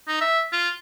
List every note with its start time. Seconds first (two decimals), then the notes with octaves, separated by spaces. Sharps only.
0.08 D#4
0.21 E5
0.52 F4